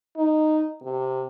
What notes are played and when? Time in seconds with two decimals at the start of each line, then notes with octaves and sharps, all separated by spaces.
0.17 D#4
0.83 C3